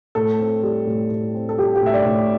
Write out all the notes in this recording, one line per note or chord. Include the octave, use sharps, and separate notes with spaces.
A2 A4
C4
G3
A2
A2
C4
A4
G3 G4
G4
A2 E5
D5
A2